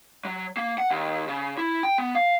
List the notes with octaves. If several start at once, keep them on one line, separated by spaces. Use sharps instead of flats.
F#3
A#3
F#5
D#2
C#3
E4
G5
B3
F5